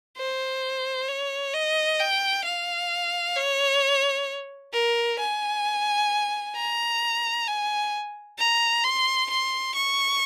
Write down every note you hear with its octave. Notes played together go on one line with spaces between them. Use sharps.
C5
C#5
D#5
G5
F5
C#5
A#4
G#5
A#5
G#5
A#5
C6
C6
C#6